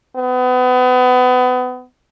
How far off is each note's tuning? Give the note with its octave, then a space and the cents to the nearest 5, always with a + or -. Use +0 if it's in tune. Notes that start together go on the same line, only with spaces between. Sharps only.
B3 +30